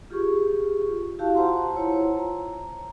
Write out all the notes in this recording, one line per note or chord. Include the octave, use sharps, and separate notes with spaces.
F4 G4 G#4 C#6
E4 F#4 G4 F5 A5
F4 C5 F#5 A5 A#5 C6
E4 F4 C5 C#5 A#5
A#5